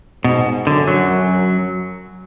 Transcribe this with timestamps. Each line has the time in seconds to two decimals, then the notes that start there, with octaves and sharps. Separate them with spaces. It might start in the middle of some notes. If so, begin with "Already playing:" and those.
0.24 G#2 B2
0.67 F#2 D3
0.87 F#3
1.09 F#2